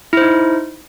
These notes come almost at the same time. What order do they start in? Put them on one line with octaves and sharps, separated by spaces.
E4 C5 D#4